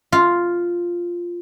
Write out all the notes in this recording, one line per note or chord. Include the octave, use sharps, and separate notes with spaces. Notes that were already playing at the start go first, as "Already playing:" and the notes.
F4